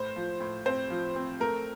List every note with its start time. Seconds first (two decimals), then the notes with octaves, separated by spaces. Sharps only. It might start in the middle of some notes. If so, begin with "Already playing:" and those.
Already playing: A2 C5
0.16 F3
0.40 A2
0.66 C4 C5
0.90 F3
1.16 C4
1.40 A3 A#4